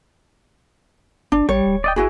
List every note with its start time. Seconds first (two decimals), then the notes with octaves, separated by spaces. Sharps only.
1.32 G1 D4
1.49 A1 G3 C#5
1.66 D1
1.84 D5 D#5 G5
1.96 G1 E4 F#4 G#4 B4